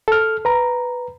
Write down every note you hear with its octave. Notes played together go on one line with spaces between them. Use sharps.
A4 F6
B4 A#5